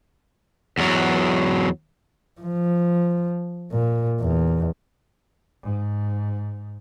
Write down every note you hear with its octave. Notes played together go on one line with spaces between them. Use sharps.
E2 F#3
F3
A#2
E2
G#2